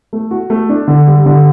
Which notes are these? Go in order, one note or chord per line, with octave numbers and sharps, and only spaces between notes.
A3
F#4
A3
D4
D3
G3
D3